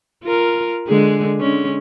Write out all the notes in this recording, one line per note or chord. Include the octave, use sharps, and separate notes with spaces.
F4 A#4
D3 G#3 G#4
D3 G#3 C#4